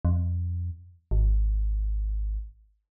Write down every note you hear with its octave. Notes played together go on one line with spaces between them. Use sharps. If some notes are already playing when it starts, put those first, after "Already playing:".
F2
G#1